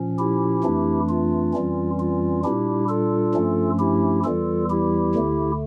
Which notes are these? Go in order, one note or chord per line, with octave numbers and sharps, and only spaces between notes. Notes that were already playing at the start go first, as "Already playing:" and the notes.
Already playing: A#2 F3 C#4
E4 G4
F2 E3 A3 D4
F4
F2 E3 G3 C#4
F4
A#2 G3 D4 E4 G4
F4 A4
G2 F3 A3 C#4
E4 G4
E2 E3 G3 F4 A4
E4 G4
D2 D3 A3